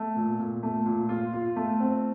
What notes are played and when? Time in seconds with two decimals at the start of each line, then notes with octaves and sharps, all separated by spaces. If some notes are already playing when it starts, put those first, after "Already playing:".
Already playing: A3
0.16 A#2
0.40 A#2
0.63 A3
0.86 A#2
1.09 F4
1.33 F4
1.56 A3
1.80 C4